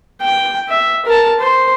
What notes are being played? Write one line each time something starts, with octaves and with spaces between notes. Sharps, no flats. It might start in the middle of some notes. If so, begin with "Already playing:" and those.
G5
E5
A#4 A5
C5